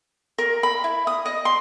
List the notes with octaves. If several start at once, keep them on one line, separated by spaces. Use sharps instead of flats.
A#4
B5
E4
D#6
D#5
C6